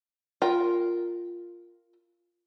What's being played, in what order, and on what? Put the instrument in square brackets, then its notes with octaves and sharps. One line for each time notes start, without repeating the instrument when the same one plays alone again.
[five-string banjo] F4 A#4 G5